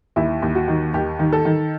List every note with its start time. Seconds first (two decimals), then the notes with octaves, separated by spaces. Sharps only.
0.16 D#2 E4
0.42 D#2
0.55 F#4
0.68 D#3
0.94 D#2 G4
1.19 D#3
1.32 A4
1.45 D#3